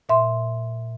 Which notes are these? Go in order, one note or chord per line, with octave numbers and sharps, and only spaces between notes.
A#2 E5 C6